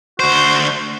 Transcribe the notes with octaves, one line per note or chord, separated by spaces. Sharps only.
D2 F#4 C5